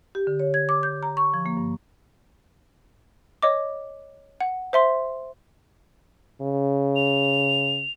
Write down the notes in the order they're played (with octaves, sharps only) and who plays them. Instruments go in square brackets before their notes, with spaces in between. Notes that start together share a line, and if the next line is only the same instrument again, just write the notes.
[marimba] G4
D3
C#5
G#6
D6
G6
A#5
C#6
F3
A#3
G2
[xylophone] C#5 D#5 D6
F#5
C5 E5 C6
[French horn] C#3
[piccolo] F7